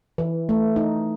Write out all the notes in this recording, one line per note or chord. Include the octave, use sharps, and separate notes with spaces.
E3
A3
D#4